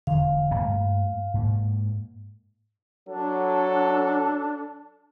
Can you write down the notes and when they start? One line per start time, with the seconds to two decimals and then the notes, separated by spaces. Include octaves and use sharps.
0.07 E1 D3 F5
0.54 G2 A3 A#3
1.34 G#2 A#3
3.09 F#3 D4 A4